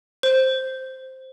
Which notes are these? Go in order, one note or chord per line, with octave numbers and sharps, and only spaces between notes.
C5